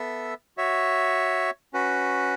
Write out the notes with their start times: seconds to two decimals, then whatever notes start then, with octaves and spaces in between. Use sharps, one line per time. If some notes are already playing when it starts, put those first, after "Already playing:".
Already playing: B3 A4 E5
0.57 F#4 C#5 E5
1.73 C#4 F#4 B4